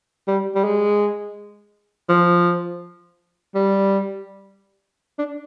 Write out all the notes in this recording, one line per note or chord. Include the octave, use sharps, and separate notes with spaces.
G3
G3
G#3
F3
G3
D4